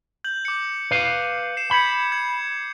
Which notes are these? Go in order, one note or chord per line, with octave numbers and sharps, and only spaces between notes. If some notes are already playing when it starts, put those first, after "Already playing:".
G6 F#7
D6 C#7
B4 F5
C7 E7
B5 G6 G#6 C#7
G#6